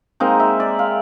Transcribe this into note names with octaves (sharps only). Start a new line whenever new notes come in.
G#3 A#3 C4 D#4
E5
D5
F5